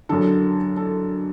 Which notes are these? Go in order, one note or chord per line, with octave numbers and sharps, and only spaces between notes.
F#2 D3 A4
A4